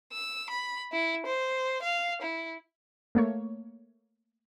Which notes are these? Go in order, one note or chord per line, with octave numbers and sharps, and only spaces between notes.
E6
B5
E4
C5
F5
E4
A3 A#3 C#5